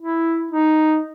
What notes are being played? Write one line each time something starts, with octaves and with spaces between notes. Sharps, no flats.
E4
D#4